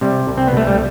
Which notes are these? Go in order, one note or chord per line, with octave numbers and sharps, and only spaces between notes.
C3 G3
C2
C4
B3
C2 A3
G3